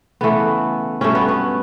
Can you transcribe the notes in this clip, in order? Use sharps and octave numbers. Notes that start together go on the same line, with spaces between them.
C#3 E3 A3 B3
G2 F#3 A3 C#4
B3
B3